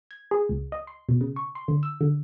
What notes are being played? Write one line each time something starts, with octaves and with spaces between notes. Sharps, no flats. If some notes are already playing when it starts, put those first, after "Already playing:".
G#6
G#4
C#2
D#5
C6
B2
C#3
C#6
C6
D3
E6
D3